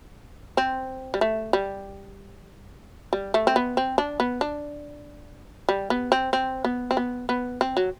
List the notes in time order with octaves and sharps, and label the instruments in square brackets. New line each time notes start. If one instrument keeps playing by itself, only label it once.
[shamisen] C4
G3
A3
G3
G3
A3
C4
B3
C4
D4
B3
D4
G3
B3
C4
C4
B3
C4
B3
B3
C4
F#3